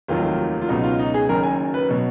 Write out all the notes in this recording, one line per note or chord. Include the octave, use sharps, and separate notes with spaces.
F1 D#2 D#3 F#3 F4
F4
F4
C#2 B2 F#3 D#4
F4
D#4
G#4
F#1 F#2 D#3 F#3 A#4
G#5
B4
B2 F#3